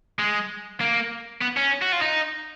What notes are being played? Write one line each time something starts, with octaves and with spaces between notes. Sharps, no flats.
G#3
A#3
B3
C#4
F#4
F4
D#4